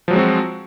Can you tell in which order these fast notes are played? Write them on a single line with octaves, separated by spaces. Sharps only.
F3 F#3 G#3 C4 F#4